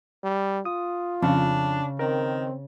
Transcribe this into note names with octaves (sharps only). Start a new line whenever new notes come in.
G3
F4 D#6
F2 C#3 D4
D#3 C4 A#4